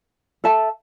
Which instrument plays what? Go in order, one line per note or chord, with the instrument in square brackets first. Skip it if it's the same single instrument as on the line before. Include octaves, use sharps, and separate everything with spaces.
[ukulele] A4 E5 A5